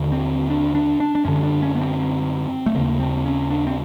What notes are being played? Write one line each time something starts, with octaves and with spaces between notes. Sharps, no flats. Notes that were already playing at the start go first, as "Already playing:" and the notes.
Already playing: D#2 D3
C4
D4
D4
D4
D4
F#2 D3 C#4
D4
C#4
B3
C4
A3
D#2 C#3 A#3
C4
C#4
D4
C4